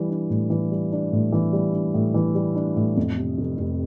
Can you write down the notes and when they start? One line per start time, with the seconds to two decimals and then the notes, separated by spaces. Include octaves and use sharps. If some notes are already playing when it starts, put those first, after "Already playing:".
Already playing: E3 G3
0.10 D4
0.30 A2
0.50 E3
0.71 G3
0.92 D4
1.12 A2
1.32 E3
1.53 G3
1.74 D4
1.94 A2
2.14 E3
2.35 G3
2.55 D4
2.76 A2
2.97 F2
3.18 C3
3.38 F1
3.58 F1